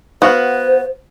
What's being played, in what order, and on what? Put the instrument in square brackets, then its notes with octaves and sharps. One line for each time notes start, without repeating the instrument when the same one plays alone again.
[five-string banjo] B3 F#4 F5 [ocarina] C5